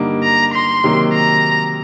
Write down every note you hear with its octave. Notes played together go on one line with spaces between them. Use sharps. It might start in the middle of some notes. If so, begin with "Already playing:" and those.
Already playing: G2 D3 G3 A#3 D#4
A#5
C6
C3 D#3 F#3 A#3 F#4
A#5